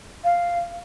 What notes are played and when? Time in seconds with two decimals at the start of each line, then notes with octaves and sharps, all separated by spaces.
0.24 F5